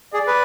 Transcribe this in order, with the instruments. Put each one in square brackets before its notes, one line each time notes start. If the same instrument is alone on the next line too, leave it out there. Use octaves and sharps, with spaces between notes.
[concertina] G#4 [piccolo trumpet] D5
[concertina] B4